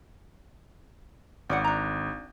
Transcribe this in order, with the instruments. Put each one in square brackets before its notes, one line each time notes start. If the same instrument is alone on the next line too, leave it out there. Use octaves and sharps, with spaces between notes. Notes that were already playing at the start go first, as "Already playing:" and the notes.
[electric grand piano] G#1 [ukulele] C#4 D5 F#5
[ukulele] D4 A#5